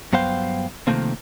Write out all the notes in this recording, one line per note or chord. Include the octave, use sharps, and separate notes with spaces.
G2 F#3 B3 C5 F5 G5
C3 D#3 F3 A3 A#3 C4